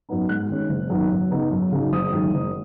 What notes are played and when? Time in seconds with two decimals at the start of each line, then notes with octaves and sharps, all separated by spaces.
0.09 F#2 F#3 B3 D#4
0.29 G#2 F#6
0.49 D#3 G#3 C#4
0.69 F#1
0.90 F#2 D#3 B3 D#4
1.11 F#2
1.31 C#3 B3 D#4
1.51 F#2
1.72 C#3 F#3 D#4
1.92 F#1 D#6
2.12 F#2 D#3 G#3
2.33 F#1